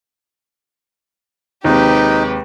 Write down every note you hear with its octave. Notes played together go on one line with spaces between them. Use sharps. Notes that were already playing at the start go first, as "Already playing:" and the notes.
D#2 C3 G#3 D#4 G4 B4